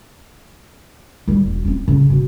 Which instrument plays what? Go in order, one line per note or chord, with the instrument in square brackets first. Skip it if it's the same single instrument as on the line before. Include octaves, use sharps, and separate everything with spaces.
[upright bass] D#3 G3
E1
C4 C#4
C#3
B2 D#3